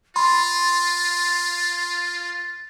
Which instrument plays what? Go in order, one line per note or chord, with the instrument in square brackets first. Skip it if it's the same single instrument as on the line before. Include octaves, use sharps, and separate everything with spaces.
[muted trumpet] F4 [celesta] B5 [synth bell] C6 [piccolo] A6